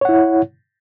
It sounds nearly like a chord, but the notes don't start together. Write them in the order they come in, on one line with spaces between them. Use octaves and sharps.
C#5 F#5 E4